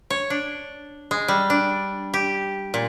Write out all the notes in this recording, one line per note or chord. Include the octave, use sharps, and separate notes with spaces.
C#5
D4
G#3
G3
D4
G4
A#2